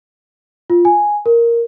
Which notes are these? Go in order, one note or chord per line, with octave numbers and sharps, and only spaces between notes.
F4
G#5
A#4